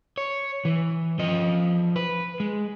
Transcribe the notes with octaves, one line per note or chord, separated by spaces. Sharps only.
C#5
E3
F3 D#5
B4
G#3